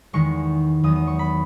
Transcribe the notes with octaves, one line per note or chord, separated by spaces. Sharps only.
E2 D#3 G#3 C#6
E2 D#3 F#3 B3 D#6
D#6
C#6
B5